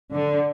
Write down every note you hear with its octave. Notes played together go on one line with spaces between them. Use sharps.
D3